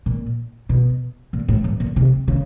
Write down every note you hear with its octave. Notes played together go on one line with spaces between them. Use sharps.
A#2
B2
A#2
A2
G2
A#2
C3
C#3